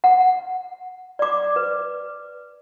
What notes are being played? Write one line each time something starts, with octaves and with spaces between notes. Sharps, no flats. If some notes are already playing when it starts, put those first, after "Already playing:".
F#5
D5 D6
B4